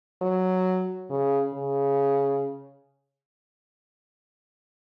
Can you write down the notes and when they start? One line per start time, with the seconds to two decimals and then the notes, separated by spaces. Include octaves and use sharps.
0.22 F#3
1.10 C#3
1.54 C#3